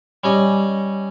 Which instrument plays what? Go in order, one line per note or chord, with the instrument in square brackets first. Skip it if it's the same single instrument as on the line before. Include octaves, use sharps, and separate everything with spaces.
[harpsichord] G3 C#4 D#5